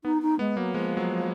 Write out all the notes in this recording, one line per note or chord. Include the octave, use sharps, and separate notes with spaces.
B3 D#4
D#4
G#3 B3
F#3 A#3
F3 G#3
F#3